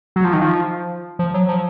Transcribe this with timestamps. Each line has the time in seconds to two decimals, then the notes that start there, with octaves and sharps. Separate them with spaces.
0.16 F#3
0.24 F3
0.33 D#3
0.42 F3
1.19 F3
1.34 F#3
1.48 F3